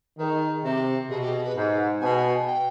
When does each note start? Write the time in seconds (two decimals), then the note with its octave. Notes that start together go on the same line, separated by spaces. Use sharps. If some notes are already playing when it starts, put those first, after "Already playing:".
0.18 D#3 G#4 B4
0.64 C3 G4
1.09 B2 G#4
1.22 G4
1.33 G#4
1.45 B4
1.56 G#2
2.01 B2 G#5
2.47 G5